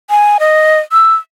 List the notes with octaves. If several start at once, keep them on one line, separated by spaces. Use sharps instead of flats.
G#5
D#5
E6